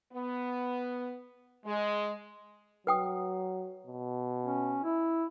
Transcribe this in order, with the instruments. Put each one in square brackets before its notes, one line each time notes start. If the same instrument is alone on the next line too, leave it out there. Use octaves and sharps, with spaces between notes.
[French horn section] B3
G#3
[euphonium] F#3 [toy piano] B4 G5 D#6
[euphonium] B2
[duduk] C#4
E4